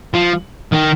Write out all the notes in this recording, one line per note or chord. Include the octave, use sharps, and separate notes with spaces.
F3
D#3